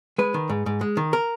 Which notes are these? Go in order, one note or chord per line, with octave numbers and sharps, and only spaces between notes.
G#3 B4
D#3
G#2
G#2
G#3
D#3
A#4